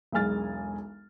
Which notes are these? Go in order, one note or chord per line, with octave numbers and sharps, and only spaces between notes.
E1 B1 G#3 G#5 F6 A6